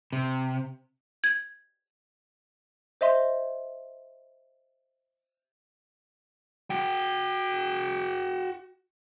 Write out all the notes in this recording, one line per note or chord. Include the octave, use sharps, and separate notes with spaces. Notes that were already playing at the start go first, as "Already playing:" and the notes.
C3
G#6
C5 D#5 E5 C6
F#4 G5